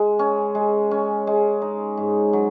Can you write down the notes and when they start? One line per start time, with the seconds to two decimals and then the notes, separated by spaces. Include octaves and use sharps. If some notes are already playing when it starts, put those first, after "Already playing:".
Already playing: G#3
0.19 C#4
0.55 G#3
0.91 C#4
1.27 G#3
1.62 D#4
1.97 G#2
2.33 F#3